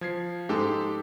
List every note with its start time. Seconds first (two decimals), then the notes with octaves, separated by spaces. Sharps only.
0.01 F3 G#6 C7
0.49 G#2 G4 A4